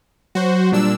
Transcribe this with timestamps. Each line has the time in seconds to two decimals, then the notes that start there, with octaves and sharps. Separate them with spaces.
0.35 F#3 F#4 C5
0.72 A#2 G3 D4 E6